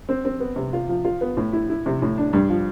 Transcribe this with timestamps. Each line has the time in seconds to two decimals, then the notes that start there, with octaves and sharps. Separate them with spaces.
0.09 C4
0.25 C4
0.40 B3
0.56 C3
0.73 F4
0.89 F3
1.05 F4
1.21 B3
1.37 A2
1.53 E4
1.70 E4
1.86 C3
2.02 A2
2.18 D4
2.33 G2
2.49 F3